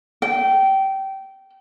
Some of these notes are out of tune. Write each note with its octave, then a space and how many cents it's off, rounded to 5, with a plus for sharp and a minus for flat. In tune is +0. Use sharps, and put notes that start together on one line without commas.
G5 -20